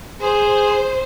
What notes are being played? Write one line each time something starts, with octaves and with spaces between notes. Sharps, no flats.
G#4 C5